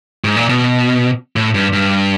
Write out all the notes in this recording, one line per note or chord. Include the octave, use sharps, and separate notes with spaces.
G#2
A#2
B2
A2
G2
G2